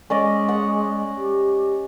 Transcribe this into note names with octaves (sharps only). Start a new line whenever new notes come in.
G#3 C#4 D5 D#5
F#5
G4